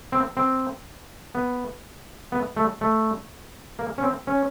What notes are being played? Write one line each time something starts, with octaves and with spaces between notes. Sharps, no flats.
C4
C4
B3
B3
A3
A3
A#3
C#4
C4
C#4